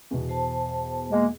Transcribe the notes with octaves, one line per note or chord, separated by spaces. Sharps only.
E2 B2
C5 A5
G#3 A#3